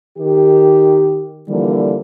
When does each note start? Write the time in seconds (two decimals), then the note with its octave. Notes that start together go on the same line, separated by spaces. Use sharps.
0.18 D#3 G4
1.49 D3 E3 F3 G3 A#3